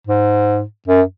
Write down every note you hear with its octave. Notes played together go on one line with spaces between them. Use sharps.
G#2
F#2